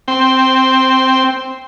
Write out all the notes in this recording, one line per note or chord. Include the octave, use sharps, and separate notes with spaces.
C4 G5